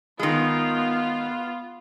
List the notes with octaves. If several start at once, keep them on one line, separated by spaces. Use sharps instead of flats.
D#3 G#3 B3 F4